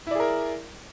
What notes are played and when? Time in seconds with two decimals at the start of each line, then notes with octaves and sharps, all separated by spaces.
0.07 E4
0.11 D5
0.15 G#4
0.20 A#4